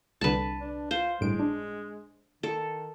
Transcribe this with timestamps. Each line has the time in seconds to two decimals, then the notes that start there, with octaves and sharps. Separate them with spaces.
0.21 C2 D3 B4 A5
0.61 D4
0.91 F4 C5
1.21 G1 A2 G#3 D7
1.40 D4
2.43 D#3 A4